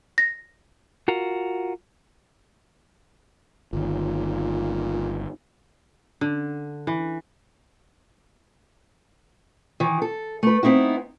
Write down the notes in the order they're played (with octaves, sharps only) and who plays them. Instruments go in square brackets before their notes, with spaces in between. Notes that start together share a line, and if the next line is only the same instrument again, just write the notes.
[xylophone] A#6
[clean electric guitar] F4 F#4 A#4
[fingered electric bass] G1 D#3 [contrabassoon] A#2
[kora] D3
E3
[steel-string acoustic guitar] D#3 E3
A4
A3 B4
B3 C4 D#4 E4 F#4